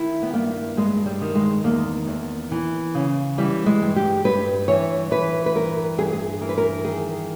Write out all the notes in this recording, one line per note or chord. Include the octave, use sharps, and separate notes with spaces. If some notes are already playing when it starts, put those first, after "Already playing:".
Already playing: D#3 E4
B3
G2 A#3
G2 G#3
G3
D#3
G#3
E2 A#3
E2
E3
C#3
E3 G3
G#3
G2
G4
G2 B4
E3 C#5
E3 B4
B4
G2 A#4
G2 G#4
G4
G#4
E3 A#4
B4
A#4
D#3 G#4